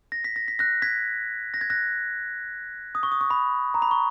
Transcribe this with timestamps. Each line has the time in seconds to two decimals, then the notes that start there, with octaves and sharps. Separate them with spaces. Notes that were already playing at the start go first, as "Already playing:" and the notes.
0.12 A#6
0.24 B6
0.36 A#6
0.48 B6
0.59 F#6 A#6
0.82 G#6 B6
1.54 A#6
1.61 G#6
1.70 F#6 A#6
2.95 D#6
3.03 C#6
3.12 D#6
3.21 C#6
3.30 B5
3.74 A#5
3.82 B5
3.91 C#6